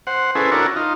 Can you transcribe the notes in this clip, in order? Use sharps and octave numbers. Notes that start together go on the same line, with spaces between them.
C5 F#5
C#4 E4 G#4 A4 B4 C5
D4 E4 F#4 A4 A#4 C#5
D#4 F4